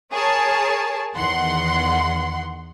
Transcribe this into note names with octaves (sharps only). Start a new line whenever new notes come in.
G#4 A#4 C#5 G#5 A5
E2 D#3 F#5 C6